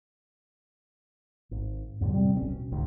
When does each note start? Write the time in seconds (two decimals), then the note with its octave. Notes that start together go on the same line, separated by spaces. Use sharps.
1.51 G#1
2.01 F2 G#2 D3 G3
2.13 C3 G3 A3 C4
2.34 D1 B1 B3 C#4
2.52 B2
2.72 F#1 C#2 G#2 D#3